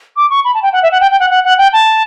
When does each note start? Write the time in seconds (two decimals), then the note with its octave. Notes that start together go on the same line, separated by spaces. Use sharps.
0.16 D6
0.30 C#6
0.45 B5
0.54 A5
0.63 G5
0.73 F#5
0.83 E5
0.91 F#5
1.01 G5
1.11 G5
1.20 F#5
1.30 F#5
1.44 F#5
1.58 G5
1.73 A5